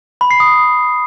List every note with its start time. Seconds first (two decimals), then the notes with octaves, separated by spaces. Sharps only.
0.21 B5
0.31 C7
0.40 D#6